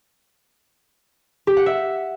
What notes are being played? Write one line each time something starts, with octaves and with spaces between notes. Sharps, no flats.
G4
F#5
E5